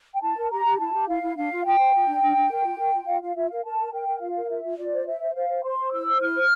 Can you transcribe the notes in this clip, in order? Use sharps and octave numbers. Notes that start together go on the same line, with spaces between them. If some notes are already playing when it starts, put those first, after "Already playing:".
G5
E4 A5
A#4
G4 A#5
G4
E4 A5
G4
E4 F5
E4
D4 F5
F4
F4 G5
C5
F4
D4
D4
D4
A#4
F4
A#4
F4
F4 F5
F4 F5
F4 E5
A#4 F5
A#4 A5
A#4
A#4 G5
A#4
F4 F5
A#4
F4 E5
F4
F4 D5
C5
C5 E5
C5
C5 F5
C5
C5 C6
C5
E4 E6
C5
E4 F6
C5